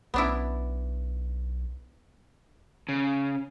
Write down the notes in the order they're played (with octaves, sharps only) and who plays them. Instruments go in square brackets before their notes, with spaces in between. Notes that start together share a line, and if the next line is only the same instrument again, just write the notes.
[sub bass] B1 [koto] B3 D4 E4
[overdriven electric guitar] C#3